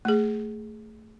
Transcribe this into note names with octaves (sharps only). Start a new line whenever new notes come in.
A3 G#4